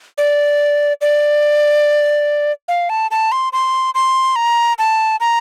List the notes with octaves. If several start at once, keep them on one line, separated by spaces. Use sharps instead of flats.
D5
D5
F5
A5
A5
C6
C6
C6
A#5
A5
A#5